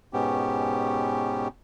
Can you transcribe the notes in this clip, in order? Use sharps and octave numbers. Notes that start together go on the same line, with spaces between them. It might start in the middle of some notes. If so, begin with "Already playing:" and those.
G#2 B2 B3 C#4 G4